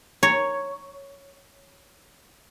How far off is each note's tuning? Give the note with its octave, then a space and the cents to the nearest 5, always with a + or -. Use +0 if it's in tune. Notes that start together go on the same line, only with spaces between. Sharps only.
C#5 +0 A#5 +0